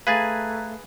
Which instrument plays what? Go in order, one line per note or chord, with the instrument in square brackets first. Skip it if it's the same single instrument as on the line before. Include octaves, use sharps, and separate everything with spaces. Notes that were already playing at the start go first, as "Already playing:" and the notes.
[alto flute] A3 [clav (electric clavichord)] G#4 B4 [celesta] F5 A6 [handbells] A#5 F#6 G#6